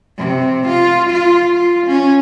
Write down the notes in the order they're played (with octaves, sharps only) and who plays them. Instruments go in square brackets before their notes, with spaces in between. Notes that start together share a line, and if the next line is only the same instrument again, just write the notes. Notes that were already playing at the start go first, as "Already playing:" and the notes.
[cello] C3
F4
F4
F4
C#4